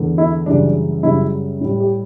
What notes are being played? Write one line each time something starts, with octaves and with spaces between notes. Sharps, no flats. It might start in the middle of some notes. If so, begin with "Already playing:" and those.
Already playing: E2 D3 A3
E4
F#2 C#3 E3 G3 D4
F#2 C#3 G3 E4
A2 G3
G4